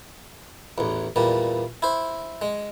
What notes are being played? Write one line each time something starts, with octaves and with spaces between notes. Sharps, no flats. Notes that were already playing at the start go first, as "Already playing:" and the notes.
A1 E2
E2 A#2 G3
E4 C5
G#3